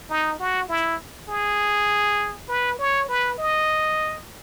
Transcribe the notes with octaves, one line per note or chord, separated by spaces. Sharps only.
D#4
F#4
E4
G#4
B4
C#5
B4
D#5